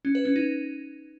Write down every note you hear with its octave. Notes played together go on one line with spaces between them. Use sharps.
C#4
B4
C#4
D#4